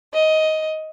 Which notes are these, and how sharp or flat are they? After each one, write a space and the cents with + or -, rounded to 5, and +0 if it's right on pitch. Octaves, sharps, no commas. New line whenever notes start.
D#5 +10